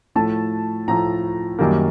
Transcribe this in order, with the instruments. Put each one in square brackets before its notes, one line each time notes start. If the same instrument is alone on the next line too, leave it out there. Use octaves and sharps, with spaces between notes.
[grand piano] A2 F3 A3 A5
A2 F3 A3 A#5
F#2 D#3 G3 A#3